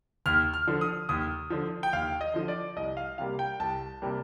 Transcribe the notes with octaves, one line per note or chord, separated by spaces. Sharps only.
D#2 F6
F6
D3 F3
D#6
D#2 D#6
D3 F3
G5
D#2 F5
D#5
D3 F3
D5
C2 D#5
F5
C3 G3 A#3 F5
G5
C2 A5
C3 G3 A#3